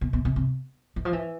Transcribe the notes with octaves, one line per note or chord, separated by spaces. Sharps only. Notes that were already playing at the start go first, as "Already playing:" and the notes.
B2
B2
C3
C3
E3
F3
E3